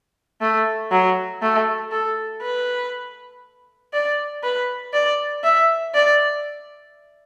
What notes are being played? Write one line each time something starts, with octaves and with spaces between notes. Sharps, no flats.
A3
F#3
A3
A4
B4
D5
B4
D5
E5
D5